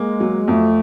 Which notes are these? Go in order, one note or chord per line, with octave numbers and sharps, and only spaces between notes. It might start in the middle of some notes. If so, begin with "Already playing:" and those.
Already playing: G#3 A#3
F#3
F2 A3